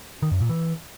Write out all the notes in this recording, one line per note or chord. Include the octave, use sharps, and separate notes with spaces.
D#3
F#2
A#2
E3